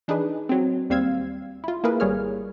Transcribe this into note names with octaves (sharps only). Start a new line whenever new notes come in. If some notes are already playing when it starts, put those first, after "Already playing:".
E3 D4 D#4 G#4 B4
F#3 C4
D#2 G3 C4 F5 E6 G#6
E4 F4
A#3 E4 G#4 A#4 B4
G#1 G3 G#4 C#5 F6